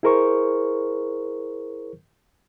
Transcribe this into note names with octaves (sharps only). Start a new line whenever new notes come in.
E4 G#4 A#4 C5 C#6